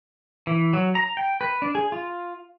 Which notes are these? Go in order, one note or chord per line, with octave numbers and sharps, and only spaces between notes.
E3
F#3
A#5
G5
B4
D4
G#4
F4